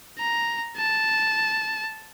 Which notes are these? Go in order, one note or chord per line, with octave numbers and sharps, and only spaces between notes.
A#5
A5